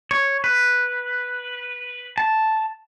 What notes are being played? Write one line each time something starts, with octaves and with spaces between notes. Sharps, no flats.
C#5
B4
A5